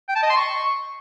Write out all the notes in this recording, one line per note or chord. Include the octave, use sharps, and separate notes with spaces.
G5
A5
D#5
C6
C#6